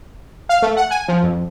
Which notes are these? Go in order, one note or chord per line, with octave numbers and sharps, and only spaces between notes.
F5
A3
F#5
G#5
F3
F2